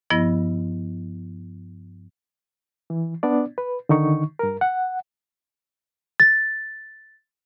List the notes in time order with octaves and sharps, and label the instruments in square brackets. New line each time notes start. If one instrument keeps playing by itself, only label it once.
[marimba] G2 F3 B3 E4 D#5 A#6
[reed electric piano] E3
B3 D4 D5
B4
D3 D#3 D#4 C#6
G2 A#4
F#5
[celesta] A6